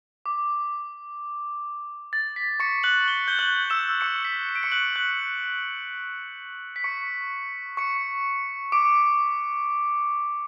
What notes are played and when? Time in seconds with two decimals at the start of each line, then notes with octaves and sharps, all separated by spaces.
0.26 D6
2.13 A6
2.36 B6
2.60 C#6 C#7
2.83 F#6 F#7
3.08 G7
3.28 G6 G7
3.39 F#6 F#7
3.70 E6 E7
4.01 C#6 C#7
4.25 B6
4.49 C#7
4.55 D7
4.63 C#6 C#7
4.72 F#6 F#7
4.96 F#6 F#7
6.76 B6
6.84 C#6 C#7
7.77 C#6 C#7
8.72 D6 D7